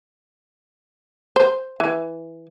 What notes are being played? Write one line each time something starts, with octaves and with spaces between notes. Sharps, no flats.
C5
E3